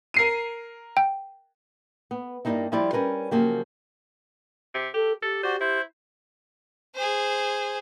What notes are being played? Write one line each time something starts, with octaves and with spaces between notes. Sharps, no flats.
A#4 C7 D#7
G5
B3
G2 G3 A#3 C4 D#4 E4
F3 G3 E4 F4 D5
G3 C#4 A#4 B4
C#3 F3 F#3 A#3 G4
C3
G4 A4
G4 A4
F#4 C5 D5
E4 C5
G#4 C5